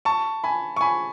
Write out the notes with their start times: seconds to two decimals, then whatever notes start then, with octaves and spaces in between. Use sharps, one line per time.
0.05 A5 C#6
0.44 G#5 B5
0.76 C#6
0.81 G#5 B5